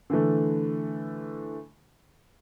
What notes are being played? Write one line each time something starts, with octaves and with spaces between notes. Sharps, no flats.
D3 E3 A3